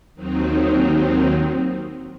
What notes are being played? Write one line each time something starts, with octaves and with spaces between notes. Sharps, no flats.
D#2 D#3 F#3 C4 D#4